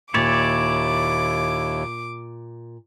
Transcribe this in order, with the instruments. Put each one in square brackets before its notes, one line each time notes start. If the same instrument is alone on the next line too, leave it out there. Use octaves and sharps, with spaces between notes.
[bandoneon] D#2 [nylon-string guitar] A#2 [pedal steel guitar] E4 C#5 D5 [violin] D6